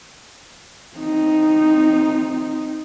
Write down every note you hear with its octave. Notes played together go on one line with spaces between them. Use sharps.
C4 D#4